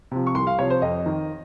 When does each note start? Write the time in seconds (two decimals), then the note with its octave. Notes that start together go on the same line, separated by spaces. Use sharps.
0.11 C3 F3
0.27 C#6
0.35 C2 C6
0.47 F5
0.59 C3 F3 C#5
0.70 C5
0.82 F2 D#5
1.06 D#3